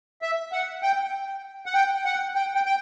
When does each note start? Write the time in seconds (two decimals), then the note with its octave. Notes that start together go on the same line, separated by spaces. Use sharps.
0.22 E5
0.52 F#5
0.83 G5
1.66 F#5
1.74 G5
2.05 F#5
2.35 G5
2.55 G5
2.66 G5